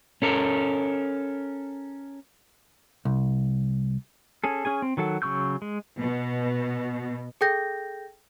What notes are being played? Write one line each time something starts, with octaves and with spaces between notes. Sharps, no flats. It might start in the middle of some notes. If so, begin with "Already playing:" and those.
C#4 A4 A#4
C2
C#4 G#4 A4
C#4 G#4 G#5
C4
D#3 F#3 A4 F#5
C#3 F#3 C#6 E6 G6
G#3
B2
G#4 A4 G5 G6 A#6